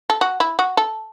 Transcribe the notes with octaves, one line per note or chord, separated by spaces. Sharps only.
A4
F#4
E4
F#4
A4